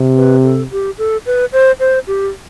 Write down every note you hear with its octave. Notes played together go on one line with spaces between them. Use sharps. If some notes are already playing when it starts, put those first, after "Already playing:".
Already playing: C3
B4
A4
G4
A4
B4
C5
C5
G4